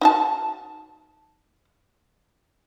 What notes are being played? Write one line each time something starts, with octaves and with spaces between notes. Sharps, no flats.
D#4 F#4 A5